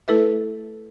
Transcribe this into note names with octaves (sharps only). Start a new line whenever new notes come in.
A3 E4 A4 B4 E5